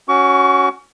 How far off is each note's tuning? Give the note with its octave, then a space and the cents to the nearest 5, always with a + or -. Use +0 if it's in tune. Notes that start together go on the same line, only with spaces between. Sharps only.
C#4 +0 F#4 +0 C#6 +35